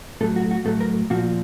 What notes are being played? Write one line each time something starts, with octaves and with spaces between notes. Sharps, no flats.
A2 F#3 A4
F#4
F#4
A2 F#3 A4
A#4
A#2 F3 F#4